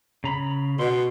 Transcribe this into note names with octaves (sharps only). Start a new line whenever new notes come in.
C#3 A#5 B5
B2 C6